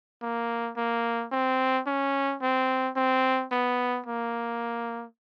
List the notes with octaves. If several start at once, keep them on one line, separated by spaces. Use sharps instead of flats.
A#3
A#3
C4
C#4
C4
C4
B3
A#3